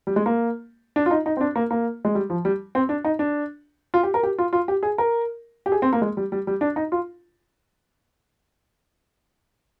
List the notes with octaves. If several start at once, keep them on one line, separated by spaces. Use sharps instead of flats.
G3
G#3
A#3
D4
F4
D#4
D#4
C4
D4
A#3
A#3
G#3
G3
F3
G3
C4
D4
D#4
D4
F4
G4
A#4
G4
F4
F4
G4
G#4
A#4
G4
G#4
C4
A#3
G#3
G3
G3
G3
D4
D#4
F4